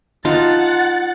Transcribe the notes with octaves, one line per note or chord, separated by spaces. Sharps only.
D#4 F4 F#5 A5 A6